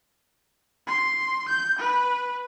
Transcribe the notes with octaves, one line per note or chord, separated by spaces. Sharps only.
C6
G6
B4